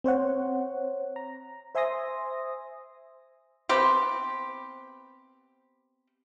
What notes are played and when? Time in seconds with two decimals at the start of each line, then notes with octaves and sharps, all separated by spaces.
0.04 C4 C5 C#5 F#5
1.16 A#5
1.75 C5 E5 G#5 C6 D#6 A#6
3.69 B3 C4 G4